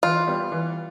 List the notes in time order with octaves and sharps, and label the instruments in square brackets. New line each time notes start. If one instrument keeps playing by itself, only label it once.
[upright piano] E3 [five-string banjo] F4
[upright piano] G3 B3
E3